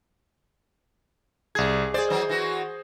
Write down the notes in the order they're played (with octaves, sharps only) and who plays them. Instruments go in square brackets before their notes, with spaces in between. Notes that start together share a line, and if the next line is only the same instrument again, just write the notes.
[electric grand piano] C2 G#6 [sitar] G#4
[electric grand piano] G#4 C5 [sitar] D5
[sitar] E3 F#3
E3 F#4